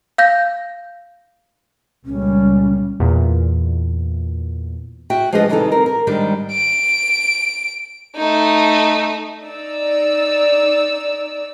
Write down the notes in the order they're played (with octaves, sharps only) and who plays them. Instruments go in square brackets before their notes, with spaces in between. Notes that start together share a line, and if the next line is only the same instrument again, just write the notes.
[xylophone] F5 G6 A#6
[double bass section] C#2 A#2 G3 [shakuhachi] C#4
[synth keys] E2 A#2
[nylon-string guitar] F#4 E5 G5
F3 G#3 D4 G#4 B4 D#5
C3 D#3 E3 G3 D#4 A4
C4 A#4
A#4
G#2 D#3 G3 D4
[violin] D7
A3 D#4
[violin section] D#4 D5 E6